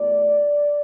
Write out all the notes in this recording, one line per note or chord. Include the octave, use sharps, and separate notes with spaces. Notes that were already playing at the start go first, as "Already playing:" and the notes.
Already playing: E2 B2 A3 D5